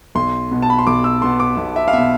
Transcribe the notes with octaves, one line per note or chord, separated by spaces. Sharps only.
B1 C6
B2 B3
A5
B5
C6
B1 D6
E6
B2 B3 C6
D6
B1
E5
F5
B2 B3 E5